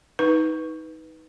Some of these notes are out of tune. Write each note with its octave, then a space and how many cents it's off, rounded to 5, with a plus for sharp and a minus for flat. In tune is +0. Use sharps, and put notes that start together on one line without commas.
D#4 +25 B4 +0